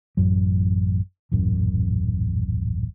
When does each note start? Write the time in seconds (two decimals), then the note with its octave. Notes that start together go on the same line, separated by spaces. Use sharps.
0.17 A1 F#2 F#3
1.32 D#1 A1 F#2